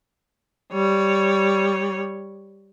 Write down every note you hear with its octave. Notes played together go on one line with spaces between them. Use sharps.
G3 C#5